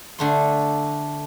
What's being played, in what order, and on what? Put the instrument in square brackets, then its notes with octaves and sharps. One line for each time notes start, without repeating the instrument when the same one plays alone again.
[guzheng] D3 A3 C6